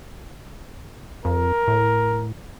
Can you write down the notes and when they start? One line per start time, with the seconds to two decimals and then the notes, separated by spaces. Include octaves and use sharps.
1.25 F2 A#4
1.67 A2